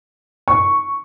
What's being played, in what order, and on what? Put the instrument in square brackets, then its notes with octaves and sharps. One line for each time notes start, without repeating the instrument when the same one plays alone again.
[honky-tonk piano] C#6